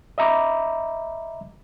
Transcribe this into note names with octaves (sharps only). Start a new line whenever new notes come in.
D#5 E5 A#5 B5 D6